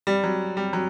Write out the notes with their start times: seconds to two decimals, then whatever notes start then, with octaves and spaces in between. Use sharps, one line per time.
0.07 G3
0.24 F#3
0.57 G3
0.73 F#3